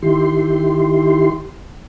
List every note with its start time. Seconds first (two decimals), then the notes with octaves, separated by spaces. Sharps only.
0.02 D#3 E4 G4 C6